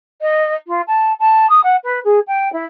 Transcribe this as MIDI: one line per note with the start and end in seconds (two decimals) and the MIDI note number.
0.22 0.54 75
0.68 0.82 65
0.87 1.13 81
1.20 1.47 81
1.50 1.60 87
1.64 1.76 78
1.84 2.00 71
2.05 2.20 68
2.28 2.52 79
2.53 2.66 64